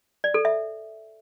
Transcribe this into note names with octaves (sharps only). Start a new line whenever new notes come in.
D5
A4
E5